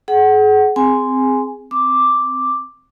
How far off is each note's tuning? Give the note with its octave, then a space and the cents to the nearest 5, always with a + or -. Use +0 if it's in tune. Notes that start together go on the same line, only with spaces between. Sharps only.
G#4 +35 F#5 +20
C4 -10 G#4 +0 G#5 +0
C4 -15 D6 +0